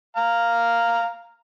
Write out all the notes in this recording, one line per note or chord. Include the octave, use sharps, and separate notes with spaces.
F5 A#5